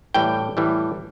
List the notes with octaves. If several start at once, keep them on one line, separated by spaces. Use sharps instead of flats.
A2 E3 G3 G5
A2 E3 G3